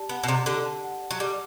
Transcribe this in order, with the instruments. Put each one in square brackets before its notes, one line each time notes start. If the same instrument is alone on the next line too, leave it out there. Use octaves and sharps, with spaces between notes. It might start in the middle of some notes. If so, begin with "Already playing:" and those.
Already playing: [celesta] G4 D5 A5
[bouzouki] B3 [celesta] F#5
[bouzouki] B2
[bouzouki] C3 [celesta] D5
[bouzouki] D3 [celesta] G4
[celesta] A5
F#5
D5
[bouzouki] F#3
[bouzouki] G3 [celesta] G4